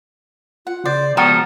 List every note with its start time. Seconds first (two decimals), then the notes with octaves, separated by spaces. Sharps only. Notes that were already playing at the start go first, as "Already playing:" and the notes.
0.67 F4 F#5
0.85 C#3 C5 D5
1.17 C#2 F3 B3 F#4 A4 G5 A#5 D#6